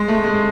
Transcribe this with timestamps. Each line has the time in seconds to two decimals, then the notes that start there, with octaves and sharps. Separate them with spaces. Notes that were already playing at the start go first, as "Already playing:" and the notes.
Already playing: G#3
0.08 A3
0.24 G#3